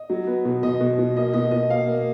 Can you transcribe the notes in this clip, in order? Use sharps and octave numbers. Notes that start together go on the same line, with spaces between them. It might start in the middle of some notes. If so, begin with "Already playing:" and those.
Already playing: D#5
F#3
B3
B2
B2 D#5
B2
B2
A#3 D#5
B2 D#5
B2 D#5
A#3 F5
A#3